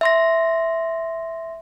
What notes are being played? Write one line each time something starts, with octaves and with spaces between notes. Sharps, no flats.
E5 C6 A#6